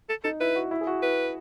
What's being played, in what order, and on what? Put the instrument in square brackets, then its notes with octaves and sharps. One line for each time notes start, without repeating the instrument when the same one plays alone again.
[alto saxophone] A4
[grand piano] D#4 [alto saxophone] A4
[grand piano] E4 [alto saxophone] B4
[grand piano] F#4
E4
G#4
F#4
[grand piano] E4 [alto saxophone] B4